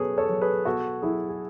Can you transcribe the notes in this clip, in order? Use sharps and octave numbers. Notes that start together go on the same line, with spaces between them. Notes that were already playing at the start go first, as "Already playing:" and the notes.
Already playing: B2 F#3 C#4 G#4 A4 B4 C#5
A4 C#5
F#3
G#4 B4
B2 F#4 A4
F#3 E4 G#4
G#4